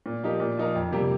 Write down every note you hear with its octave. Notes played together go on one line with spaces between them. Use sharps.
A#2
F3 D#4 G4 A#4
A#2
F3 D#4 A#4
F2
C3 G3 A#3 G4